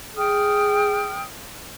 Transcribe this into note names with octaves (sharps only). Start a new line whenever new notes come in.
G#4 G5 D#6 F6